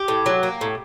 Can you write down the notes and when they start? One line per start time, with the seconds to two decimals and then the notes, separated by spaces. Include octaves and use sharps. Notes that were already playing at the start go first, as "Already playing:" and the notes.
Already playing: G4
0.08 A2
0.26 F#3
0.43 A#3
0.61 A2